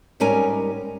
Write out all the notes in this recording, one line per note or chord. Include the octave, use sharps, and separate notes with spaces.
G#2 G3 C#4 A#4 G#5